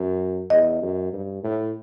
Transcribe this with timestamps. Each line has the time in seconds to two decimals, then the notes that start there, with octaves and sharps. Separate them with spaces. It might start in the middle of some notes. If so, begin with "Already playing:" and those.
Already playing: F#2
0.50 E2 D#5
0.82 F#2
1.13 G2
1.43 A2